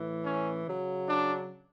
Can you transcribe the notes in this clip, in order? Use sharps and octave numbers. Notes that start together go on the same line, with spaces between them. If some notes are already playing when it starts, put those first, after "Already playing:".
Already playing: A2 E3
C#4
C#3 F#3
D4